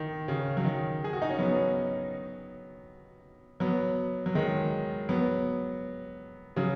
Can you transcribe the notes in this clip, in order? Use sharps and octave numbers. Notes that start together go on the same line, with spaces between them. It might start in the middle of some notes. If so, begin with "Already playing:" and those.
Already playing: D#3
C#3
F#3
D#3
G#4
F#4
D#4
C#4
F#3 B3
F#3 B3
F#3
D#3 G#3
F#3 B3
C#3 F#3